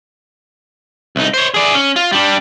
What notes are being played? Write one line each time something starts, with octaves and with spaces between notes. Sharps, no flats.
C2 D#4
C5 C#5
G#4 D5
C#4
F4
G3 D4